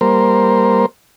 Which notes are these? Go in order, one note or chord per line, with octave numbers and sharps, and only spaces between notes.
G3 A#3 A#4 C5